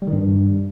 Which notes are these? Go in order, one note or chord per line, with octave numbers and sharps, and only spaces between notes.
G3
D#3
G2